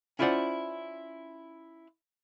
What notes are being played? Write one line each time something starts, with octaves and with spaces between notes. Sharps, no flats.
C#4 E4 F4 C5 D5 F#5